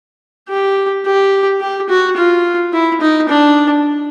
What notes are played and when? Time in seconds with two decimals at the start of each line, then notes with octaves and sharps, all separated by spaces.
0.48 G4
1.05 G4
1.61 G4
1.89 F#4
2.16 F4
2.73 E4
3.01 D#4
3.29 D4